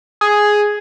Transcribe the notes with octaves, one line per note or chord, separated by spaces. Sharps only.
G#4